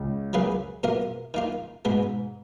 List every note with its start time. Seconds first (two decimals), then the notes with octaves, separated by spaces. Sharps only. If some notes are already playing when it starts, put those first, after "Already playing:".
Already playing: C#2 C#3
0.33 F#3 A#3 F4 G#4 B4
0.84 B2 A#3 F4 A#4
1.34 D#3 A#3 F4
1.85 G#2 B2 G#3 B3